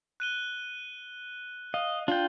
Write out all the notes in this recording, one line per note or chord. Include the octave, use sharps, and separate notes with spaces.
F#6 D#7 G7
D#5 F5
D4 F4 G5